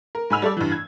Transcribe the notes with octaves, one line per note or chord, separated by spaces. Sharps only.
A#4
G#2 G#5 B5 E6 F7
G3 A4 D5
G2 E3
G#6